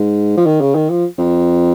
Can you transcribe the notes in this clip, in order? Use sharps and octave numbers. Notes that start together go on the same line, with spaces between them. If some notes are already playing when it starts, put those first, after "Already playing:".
Already playing: G#2
F3
D#3
C#3
D#3
F3
F2